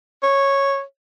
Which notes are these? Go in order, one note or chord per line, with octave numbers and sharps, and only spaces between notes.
C#5